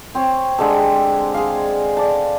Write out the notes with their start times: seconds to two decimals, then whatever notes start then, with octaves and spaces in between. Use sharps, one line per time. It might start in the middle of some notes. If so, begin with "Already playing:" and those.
0.15 C4 C#5
0.58 D3 G#3 G4 A4
1.34 G#4 F5
1.97 D5 A5